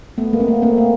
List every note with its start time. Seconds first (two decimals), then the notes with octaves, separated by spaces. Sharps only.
0.18 A3 B3
0.33 G#3 A#3
0.40 C4
0.48 A3 B3
0.62 A#3 C4
0.77 A3 B3